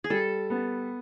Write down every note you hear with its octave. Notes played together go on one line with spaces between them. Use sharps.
G#4
G3 A4
B3